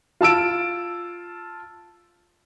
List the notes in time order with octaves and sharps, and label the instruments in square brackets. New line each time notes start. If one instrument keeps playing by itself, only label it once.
[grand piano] F4 A5 E6 D7